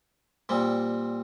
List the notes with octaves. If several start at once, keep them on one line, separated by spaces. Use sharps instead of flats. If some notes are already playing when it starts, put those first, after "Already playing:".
A#2 G3 C4